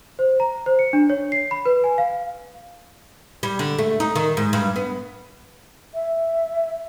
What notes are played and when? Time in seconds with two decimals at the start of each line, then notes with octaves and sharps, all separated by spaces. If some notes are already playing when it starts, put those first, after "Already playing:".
0.19 C5
0.40 A#5
0.66 C5
0.79 C#7
0.93 D4
1.10 C#5
1.32 C7
1.51 B5
1.66 B4
1.84 G#5
1.98 F5
3.43 G3
3.59 D3
3.79 A3
4.00 D#4
4.15 D#3
4.37 G#2
4.53 G2
4.76 B3
5.94 E5